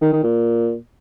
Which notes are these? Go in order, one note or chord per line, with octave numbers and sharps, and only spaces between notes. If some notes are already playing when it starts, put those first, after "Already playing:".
D#3
D#3
A#2